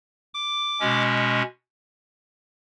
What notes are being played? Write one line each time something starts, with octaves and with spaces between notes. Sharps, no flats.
D6
B2 G#3 C#4